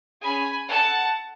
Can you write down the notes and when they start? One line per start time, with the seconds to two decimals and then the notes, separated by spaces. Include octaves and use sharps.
0.21 C#4 G#4 G#5 B5
0.68 A4 F#5 A5